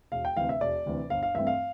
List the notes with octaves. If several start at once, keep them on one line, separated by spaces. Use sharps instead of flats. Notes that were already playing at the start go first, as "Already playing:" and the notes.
E1 F5
G5
D2 C3 E3 F5
E5
E1 D5
D2 C3 E3
G1 F5
F5
G2 E3 A3 C4 E5
F5